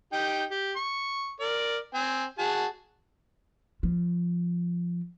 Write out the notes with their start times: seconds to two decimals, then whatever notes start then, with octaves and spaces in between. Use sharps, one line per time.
0.13 D#4 G4 G5
0.51 G4
0.76 C#6
1.40 A#4 D5
1.94 C4 G#5
2.39 F#4 G#4 A5
3.83 F3